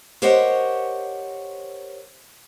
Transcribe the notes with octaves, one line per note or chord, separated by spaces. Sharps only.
G4 A#4 C5 C#5 D#5 F#5